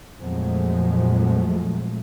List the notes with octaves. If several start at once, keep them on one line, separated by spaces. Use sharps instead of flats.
F2 A#2 F3 F#3 G#3 A3